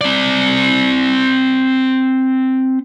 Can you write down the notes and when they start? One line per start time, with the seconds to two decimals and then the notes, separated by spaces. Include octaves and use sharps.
0.01 C4 D5